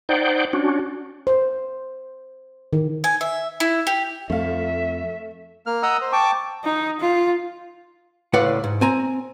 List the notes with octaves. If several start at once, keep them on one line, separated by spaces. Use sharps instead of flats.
D#4 C5 D5 F#5 G5
C#4 D4 F#4
C5
D#3
G#5
E5
E4
G4
F2 A3 E5 F5
A#3 F6
D#5 F#5 A#5 D#6 E6
C5
G5 A5 C#6 D6
D#4
F4
C#2 A2 B4 D5 F5 F#5
G#2
C4 G#5 A#5